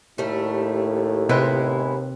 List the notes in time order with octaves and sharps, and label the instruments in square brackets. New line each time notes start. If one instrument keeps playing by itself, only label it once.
[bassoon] D#2 [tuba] A2 [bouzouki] G3 A3
[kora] C3 B4 [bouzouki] G#3 B3 E4